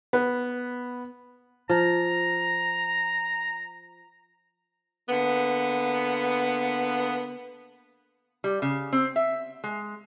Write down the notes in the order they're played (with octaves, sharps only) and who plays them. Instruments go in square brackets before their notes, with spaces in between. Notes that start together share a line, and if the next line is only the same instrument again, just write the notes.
[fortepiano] B3
[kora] F3 [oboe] A#5
[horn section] D3 A#3 B3
[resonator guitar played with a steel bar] G3
C#3
C4
E5
G#3